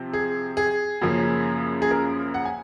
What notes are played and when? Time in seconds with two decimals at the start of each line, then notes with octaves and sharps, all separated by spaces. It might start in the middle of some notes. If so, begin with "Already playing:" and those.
Already playing: C3 F3 C4
0.13 G#4
0.57 G#4
1.01 F#2 C#3 F3 A#3 C#4
1.82 G#4
1.91 A#4
2.34 F#5
2.45 G#5